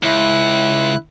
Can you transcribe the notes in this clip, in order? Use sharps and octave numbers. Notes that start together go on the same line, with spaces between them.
C#2 E4 F#6